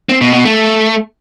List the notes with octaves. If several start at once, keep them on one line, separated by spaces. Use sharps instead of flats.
C4
B2
B2
A3